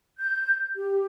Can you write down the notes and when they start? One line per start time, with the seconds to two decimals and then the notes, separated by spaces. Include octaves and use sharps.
0.18 G6
0.76 G4